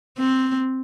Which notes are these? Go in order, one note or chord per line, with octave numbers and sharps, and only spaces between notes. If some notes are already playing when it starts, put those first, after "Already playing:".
C4